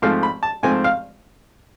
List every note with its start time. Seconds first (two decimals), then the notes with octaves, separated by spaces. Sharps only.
0.02 G#2 F3 A3 C4 F5
0.23 B5
0.43 A5
0.63 G#2 F3 A3 C4 G#5
0.84 F5